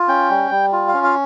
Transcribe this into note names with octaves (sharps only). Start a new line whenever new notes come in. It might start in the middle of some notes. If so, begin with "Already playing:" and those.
Already playing: F4
C#4 G5
G3
G3
F4
F5
C#4
F5